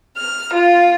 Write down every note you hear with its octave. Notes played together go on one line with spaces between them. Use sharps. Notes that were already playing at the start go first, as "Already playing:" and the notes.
F6
F4